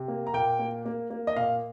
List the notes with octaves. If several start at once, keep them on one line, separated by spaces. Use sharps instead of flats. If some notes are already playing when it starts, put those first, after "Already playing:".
Already playing: C3
A#3
A#5
A#2 G5
A#3
A#3
A#3
D#5
A#2 F5